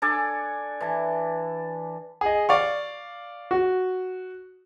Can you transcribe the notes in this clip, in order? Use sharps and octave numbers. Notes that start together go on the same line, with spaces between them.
D4 A4 D5 G#5
E3 A5
G#4 D#5
D5 F5 C#6
F#4